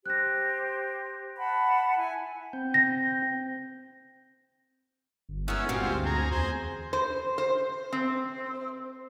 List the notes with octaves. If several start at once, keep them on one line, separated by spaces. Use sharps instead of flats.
G4 C5 F#6 A#6
F#5 A5 B5
E4 G#5
C4 G5
A#6
G1
G#3 B3 C#4 E4 A#4
G2 A#2 G#3 C4 F4 F#4
D2 C5
G#4 A#5
E2 C5
C5
C5
C4